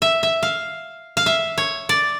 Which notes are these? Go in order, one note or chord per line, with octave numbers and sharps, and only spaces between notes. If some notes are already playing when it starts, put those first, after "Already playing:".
E5
E5
F5
F5
E5
C#5
D5